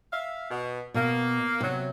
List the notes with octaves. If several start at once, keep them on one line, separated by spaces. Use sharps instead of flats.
E5 F5
B2
B2 A#3
C3 F#3